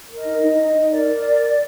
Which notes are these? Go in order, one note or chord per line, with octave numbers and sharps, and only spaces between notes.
A#4
D#5
D#4
D#4
D#4
D#4
A#4 D5
A#4